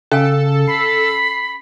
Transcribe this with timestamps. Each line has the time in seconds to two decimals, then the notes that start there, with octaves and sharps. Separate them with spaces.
0.11 C#3 C#4 A4 F5 G#5
0.68 B5 C7